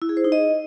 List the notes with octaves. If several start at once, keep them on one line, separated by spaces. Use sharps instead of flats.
E4
G#4
C5
D#4
D#5